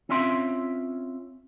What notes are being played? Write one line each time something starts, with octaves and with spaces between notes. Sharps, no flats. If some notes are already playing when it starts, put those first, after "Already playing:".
C4 C#4 F4 E5 C6